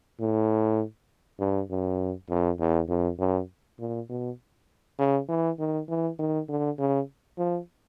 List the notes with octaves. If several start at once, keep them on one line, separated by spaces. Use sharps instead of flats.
A2
G2
F#2
F2
E2
F2
F#2
A#2
B2
C#3
E3
D#3
E3
D#3
D3
C#3
F3